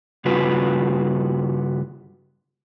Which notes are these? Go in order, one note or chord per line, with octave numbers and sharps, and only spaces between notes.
G2 C#3 G3 F4 F#4 B4